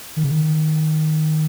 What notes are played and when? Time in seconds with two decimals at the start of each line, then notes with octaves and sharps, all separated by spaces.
0.16 D#3
0.23 C#3
0.31 D#3